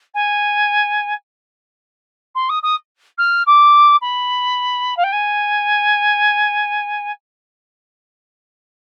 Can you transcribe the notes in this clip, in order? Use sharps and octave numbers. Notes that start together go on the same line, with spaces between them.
G#5
C6
D#6
D#6
F6
D6
B5
F5
G5
G#5